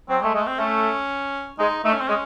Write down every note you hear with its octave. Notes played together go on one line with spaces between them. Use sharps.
F#3 C4
G#3 A3
G#3 A3
C4
A3 C#4
G#3 D#4
A3 D#4
C#4
C4
G#3 C#4